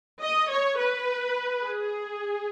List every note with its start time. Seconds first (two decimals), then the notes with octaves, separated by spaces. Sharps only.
0.22 D#5
0.49 C#5
0.78 B4
1.62 G#4